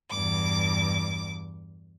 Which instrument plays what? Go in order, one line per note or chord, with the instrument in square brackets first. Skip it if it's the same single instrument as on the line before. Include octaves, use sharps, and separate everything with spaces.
[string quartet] E2 G2 D6